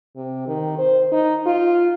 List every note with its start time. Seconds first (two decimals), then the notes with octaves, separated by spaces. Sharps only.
0.16 C3
0.47 D#3
0.79 C5
1.12 D#4
1.46 F4